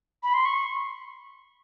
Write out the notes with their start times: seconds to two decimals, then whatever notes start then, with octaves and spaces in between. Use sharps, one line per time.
0.23 B5
0.34 C6
0.45 C#6